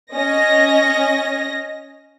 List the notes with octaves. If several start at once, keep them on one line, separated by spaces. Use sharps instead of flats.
C#4 D#5 A#6